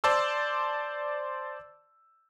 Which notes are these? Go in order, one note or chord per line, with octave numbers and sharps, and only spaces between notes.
C5 D5 A5 C6 E6